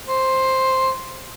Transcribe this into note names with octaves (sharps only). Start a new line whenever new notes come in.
C5